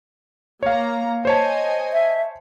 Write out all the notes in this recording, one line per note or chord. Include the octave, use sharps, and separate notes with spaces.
A#3 C#5 F5 A#5
C5 C#5 D#5 G#5 A5
E5